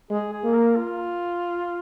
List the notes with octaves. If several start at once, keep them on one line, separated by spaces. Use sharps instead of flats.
G#3 G#4
G#4
A#3
A#4
F4